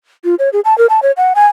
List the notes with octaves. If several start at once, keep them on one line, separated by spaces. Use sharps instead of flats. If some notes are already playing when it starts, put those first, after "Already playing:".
F4
C#5
G#4
A5
A#4
A5
C#5
F#5
G#5